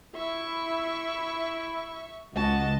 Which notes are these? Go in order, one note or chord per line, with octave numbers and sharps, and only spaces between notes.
E4 E5 C#6
C#2 F#4 D#5 A5